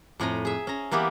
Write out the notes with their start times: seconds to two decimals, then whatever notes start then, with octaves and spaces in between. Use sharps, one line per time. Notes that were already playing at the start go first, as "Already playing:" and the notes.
0.20 F2 A2 G#5 A#5
0.45 G#4 E5
0.67 C#4 A#5
0.91 E3 A#3 B3 E4 G4